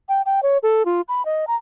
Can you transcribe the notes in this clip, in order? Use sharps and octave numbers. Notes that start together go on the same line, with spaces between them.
G5
G5
C#5
A4
F4
B5
D#5
A#5